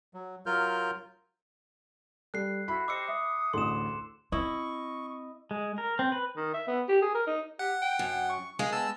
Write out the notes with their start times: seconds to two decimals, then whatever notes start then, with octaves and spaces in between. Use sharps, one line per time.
0.14 F#3
0.46 F#3 F4 A#4 F6 G6
2.34 G3 A4 F#6 C7
2.68 E4 F#4 B5
2.88 G4 C5 D#5 D6 E6 C#7
3.08 E5 D#6
3.54 A1 D2 G#4 A4 C6 E7
4.32 C4 E4 D#5 C#6
5.51 G#3
5.78 A#4
5.99 C4
6.12 B4
6.37 D#3
6.54 E5
6.68 B3
6.89 G4
7.02 G#4
7.15 A#4
7.27 D#4
7.59 G4 F#5
7.82 G5
7.99 F#2
8.29 C#6
8.59 G#3 G#4 F5
8.72 B3 A5 E6